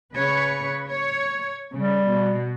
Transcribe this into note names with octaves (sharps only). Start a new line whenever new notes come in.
C#3 B4 C#5
C#5
C#3 G3
B2